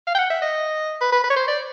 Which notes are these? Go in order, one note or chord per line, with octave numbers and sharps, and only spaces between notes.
F5
G5
F#5
E5
D#5
B4
B4
B4
C#5
C5
D5